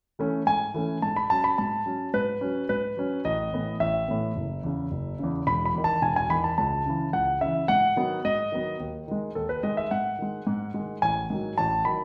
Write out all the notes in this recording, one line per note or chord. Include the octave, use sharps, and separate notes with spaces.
E3 A3 C#4
G#2 G#5
E3 A3 C#4
G#2 A5
B5
F#3 C#4 A5
B5
G#2 A5
F#3 C#4
G#2 B4
F#3 C#4
G#2 B4
F#3 C#4
A1 D#5
A2 E3 B3
A1 E5
A2 E3 B3
F#1
E2 C#3
F#1
E2 C#3
E1 B5
B5
E2 D#3
A5
E1 G#5
G#5
E2 D#3 B5
A5
C#2 A5
C#3 E3
C#2 F#5
C#3 E3 E5
G#2 F#5
D#3 F#3 B3
G#2 D#5
D#3 F#3 B3
D#2
D#3 G#3
D#2 A4
B4
D#3 G#3 D#5
E5
G#2 F#5
D#3 G#3
G#2
D#3 G#3
A1 G#5
G#2 D#3 F#3
A1 A5
D#3 F#3 B5